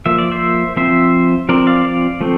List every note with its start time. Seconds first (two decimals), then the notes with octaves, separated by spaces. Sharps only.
0.06 F3 A#3 E5
0.18 D5
0.31 C5 E5
0.76 F3 C4 C5 E5
1.49 F3 C4 A#4 D5
1.67 D5 F5
1.85 D5 F5
2.21 F3 A3 C4